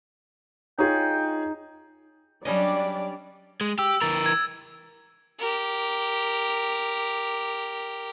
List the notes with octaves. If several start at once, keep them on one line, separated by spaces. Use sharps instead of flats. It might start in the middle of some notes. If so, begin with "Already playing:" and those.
D#4 F4 G#4 C#5 G5
F#3 G3 C#4 D4 G4 D5 D#5
G#3
G4 E6
E3 A#4 A6
G#6
G4 A#4